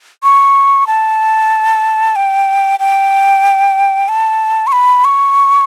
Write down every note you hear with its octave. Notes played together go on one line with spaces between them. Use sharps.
C#6
A5
G5
G5
A5
C#6
B5
C#6